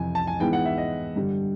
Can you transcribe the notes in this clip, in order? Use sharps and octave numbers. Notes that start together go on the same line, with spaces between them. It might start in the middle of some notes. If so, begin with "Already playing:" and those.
Already playing: F2 C3 E3 G#5
A5
G#5
G#2 E3 G#3 B3 G5
F#5
E5
D#5
G2 D3 G3